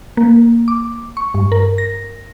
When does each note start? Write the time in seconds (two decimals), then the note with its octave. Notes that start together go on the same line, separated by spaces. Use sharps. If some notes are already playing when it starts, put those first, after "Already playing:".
0.17 A#3
0.68 D6
1.17 C#6
1.34 G2
1.52 A#4
1.78 A#6